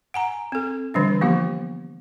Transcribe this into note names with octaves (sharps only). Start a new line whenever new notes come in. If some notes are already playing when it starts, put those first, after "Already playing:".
F#5 G#5 A#5
C4 A4
D3 E3 G3 D4
F3 A#3 B3 F4 G4